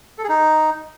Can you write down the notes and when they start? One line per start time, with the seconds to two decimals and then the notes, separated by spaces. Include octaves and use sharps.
0.18 A4
0.23 G#4
0.29 D#4